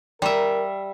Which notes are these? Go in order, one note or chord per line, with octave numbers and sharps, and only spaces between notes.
G3 A#4 E5